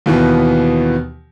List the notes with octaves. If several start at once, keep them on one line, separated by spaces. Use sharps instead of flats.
D#2 B2 E3 B3